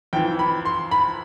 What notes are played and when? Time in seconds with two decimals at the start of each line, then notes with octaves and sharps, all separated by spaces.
0.13 F2 E3 G5
0.39 B5
0.65 C6
0.91 B5